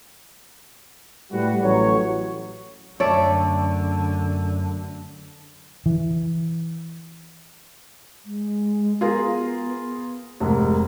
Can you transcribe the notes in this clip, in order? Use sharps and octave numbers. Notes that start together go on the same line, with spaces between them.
A2 G3 F#4 B4
A1 F#3 C#5
F#2 D3 A3 C#5 D5
E3
G#3
B3 F4 G#4 A#4
F1 G#2 A#4